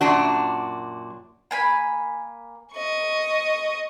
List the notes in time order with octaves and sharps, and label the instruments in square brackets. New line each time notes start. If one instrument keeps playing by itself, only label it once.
[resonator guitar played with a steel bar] F#2 A#2 D4 F#4
[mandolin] A#3 G#5 B5
[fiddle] D#5 C#6